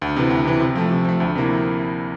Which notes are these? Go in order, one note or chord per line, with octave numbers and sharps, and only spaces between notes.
D2
C3 E3
D2
C3 E3
C3
F3 A3
C3
F3 A3
D2
C3 F3 A#3 E4